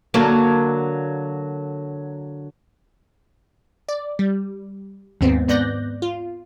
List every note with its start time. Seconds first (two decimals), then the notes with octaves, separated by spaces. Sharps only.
0.14 D3 F#3 A#3
3.89 D5
4.19 G3
5.21 D#2 G#2 B3 C4
5.48 G#2 B3 D5 F#6 G6 A#6
6.02 F4